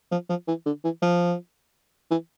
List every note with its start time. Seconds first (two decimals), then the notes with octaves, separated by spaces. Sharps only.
0.12 F3
0.30 F3
0.48 E3
0.66 D3
0.84 E3
1.02 F3
2.11 E3